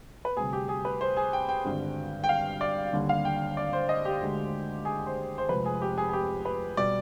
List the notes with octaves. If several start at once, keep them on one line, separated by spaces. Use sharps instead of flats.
B4
D2 C3 G3 G#4
G4
G#4
B4
C5
G#4
G5
G5
G#1 G2 D3 G3
G5
F5
D5
D#2 D3 G3
F5
G5
D5
C5
D#5
G4
D2 D3 G#3
G#4
C5
C5
F1 F2 C3 F3 G#3 B4
G#4
G4
G#4
G#4
G4
B4
B2 G3 D5